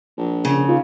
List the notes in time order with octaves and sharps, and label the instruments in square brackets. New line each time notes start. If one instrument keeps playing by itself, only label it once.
[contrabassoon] A#1
[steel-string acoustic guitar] C#3
[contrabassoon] D#2 [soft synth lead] F4